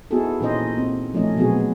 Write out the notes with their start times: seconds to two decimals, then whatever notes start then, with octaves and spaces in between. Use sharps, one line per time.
0.11 B3 D#4 E4 F#4 G#4 A4
0.40 A#2 E3 C#4 D#4 C5 D#5
0.77 C4
1.14 F3 A3 C#4 D#4 D#5
1.36 B2 F#3 B3 C4 F#4 G#4